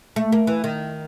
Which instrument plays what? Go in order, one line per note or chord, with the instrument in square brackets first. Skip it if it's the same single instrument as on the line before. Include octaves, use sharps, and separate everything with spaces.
[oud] A3
A#3
E3
D#3